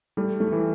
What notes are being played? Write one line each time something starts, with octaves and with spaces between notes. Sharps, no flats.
G3 A3
A3
E3